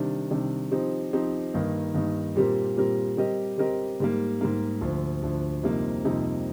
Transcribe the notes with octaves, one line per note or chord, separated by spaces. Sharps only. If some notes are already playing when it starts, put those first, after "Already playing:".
Already playing: C3 D#3 G3 D4
C3 D#3 G3 D4
F3 C4 D#4 G4
F3 C4 D#4 G4
G2 D#3 A#3 D#4
G2 D#3 A#3 D#4
A#2 G3 C4 G4 A#4
A#2 G3 C4 G4 A#4
G3 C4 G4 A#4 D#5
G3 C4 G4 A#4 D#5
G#2 G3 A#3
G#2 G3 A#3
D2 D3 F3
D2 D3 F3
F2 C3 G3 A#3 D#4
F2 C3 G3 A#3 D#4